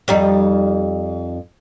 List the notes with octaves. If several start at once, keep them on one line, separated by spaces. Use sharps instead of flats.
F2 G3 D#4